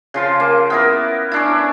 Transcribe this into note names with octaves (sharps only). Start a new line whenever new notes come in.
C#3 F3 F4
A#3
B3 E4 A#4
C#4 D4 E4